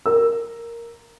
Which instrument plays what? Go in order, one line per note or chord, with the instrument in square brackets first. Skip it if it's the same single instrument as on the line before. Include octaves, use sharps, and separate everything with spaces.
[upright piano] A#4 E6